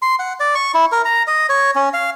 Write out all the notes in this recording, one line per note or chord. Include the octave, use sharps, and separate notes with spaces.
C6
F#5
D5
C#6
E4
A#4
A#5
D#5
C#5
C#4
F5